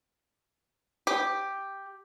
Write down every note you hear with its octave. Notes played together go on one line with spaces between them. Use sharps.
G4